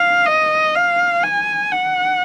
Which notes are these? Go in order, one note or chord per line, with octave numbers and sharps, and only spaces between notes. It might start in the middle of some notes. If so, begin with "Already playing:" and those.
Already playing: F5
D#5
F5
G#5
F#5